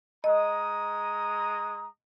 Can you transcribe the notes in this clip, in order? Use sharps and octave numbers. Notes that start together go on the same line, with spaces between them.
G#3 D#5 A#5 D#6